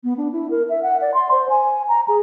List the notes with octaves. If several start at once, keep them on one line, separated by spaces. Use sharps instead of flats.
B3
D4
E4
A#4
E5
F#5
D5
C6
C5
G#5
A#5
G#4